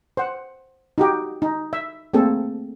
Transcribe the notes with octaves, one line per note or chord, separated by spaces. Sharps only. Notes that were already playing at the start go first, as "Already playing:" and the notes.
C5 F#5
D#4 F#4 G4
D#4
E5
A3 A#3 C4 G#4 A4